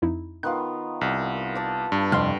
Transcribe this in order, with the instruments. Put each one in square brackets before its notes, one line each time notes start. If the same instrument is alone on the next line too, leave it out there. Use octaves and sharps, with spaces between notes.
[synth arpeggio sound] F2 D#4 E4
[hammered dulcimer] D#3 B3 F4 [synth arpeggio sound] F#6
[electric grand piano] C2
[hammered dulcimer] D5 A5
[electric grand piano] G2
[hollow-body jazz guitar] C2 F2 C6 [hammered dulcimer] G4 A4 F#5 [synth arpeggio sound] F6